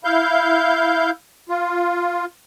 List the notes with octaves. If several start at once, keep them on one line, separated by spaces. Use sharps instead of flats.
E4 F5 G6
F4